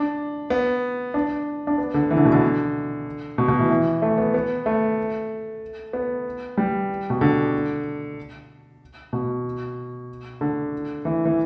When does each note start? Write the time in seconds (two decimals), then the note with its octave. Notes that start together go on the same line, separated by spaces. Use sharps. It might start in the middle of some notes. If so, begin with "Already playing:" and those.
Already playing: D4
0.50 B3
1.14 D4
1.67 D4
1.78 B3
1.94 D3
2.10 E3
2.17 D3
2.25 B2
2.32 D3
3.38 B2
3.48 B2
3.59 E3
3.70 E3
4.02 A3
4.18 B3
4.34 B3
4.66 A3
5.93 B3
6.57 G3
7.10 B2
7.21 D3
9.13 B2
10.41 D3
11.05 E3
11.25 E3